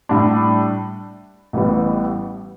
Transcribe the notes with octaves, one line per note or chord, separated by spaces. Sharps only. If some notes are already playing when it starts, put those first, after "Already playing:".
A2 G3 D4
A1 A2 E3 G3 B3